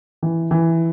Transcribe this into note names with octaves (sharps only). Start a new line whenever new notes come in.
E3
E3